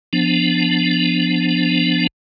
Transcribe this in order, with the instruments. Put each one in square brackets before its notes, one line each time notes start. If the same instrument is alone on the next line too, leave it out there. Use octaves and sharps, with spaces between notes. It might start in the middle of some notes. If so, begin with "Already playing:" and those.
[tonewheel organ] F3 B3 D4